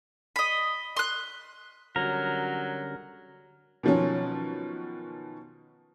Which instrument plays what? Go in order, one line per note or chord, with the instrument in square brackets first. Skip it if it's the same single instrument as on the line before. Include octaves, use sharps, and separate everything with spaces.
[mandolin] D#5 B5
C6 F#6
[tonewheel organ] D3 G3 C#4 [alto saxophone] F#3 [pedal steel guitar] A#4
[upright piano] B2 D#3 F3 F#3 C#4